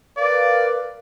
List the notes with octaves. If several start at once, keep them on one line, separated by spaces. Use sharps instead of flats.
A#4 B4 D5 F5